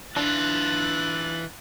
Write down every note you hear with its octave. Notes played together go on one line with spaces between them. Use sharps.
E3 D4 F4 F#6 A6